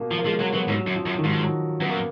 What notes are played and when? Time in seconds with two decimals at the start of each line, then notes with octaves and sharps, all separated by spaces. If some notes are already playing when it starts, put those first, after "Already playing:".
Already playing: B2 A#3
0.11 F3
0.18 A#3
0.25 F3 G#3
0.40 F#3 G#3
0.54 F#3 B3
0.68 G#2 F#3
0.87 F#2
0.96 F3
1.06 F#2
1.18 D#3
1.24 G#2 F3
1.43 F#3
1.80 F#2 B3
1.88 A#3